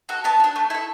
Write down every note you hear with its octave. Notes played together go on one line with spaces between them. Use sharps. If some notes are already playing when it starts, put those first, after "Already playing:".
F#4 A4
B3 A5
F#4
D4
A3
E4 A4